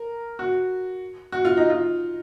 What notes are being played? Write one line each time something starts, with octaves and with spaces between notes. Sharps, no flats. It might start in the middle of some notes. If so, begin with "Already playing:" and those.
Already playing: A#4
F#4
F#4
F4
D#4
F4